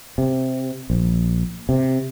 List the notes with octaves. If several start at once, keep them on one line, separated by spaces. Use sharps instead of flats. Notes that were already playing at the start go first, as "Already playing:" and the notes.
C3
A#1
C3